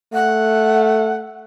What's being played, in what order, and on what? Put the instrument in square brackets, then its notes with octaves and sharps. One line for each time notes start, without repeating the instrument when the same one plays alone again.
[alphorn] A3 [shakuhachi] F#5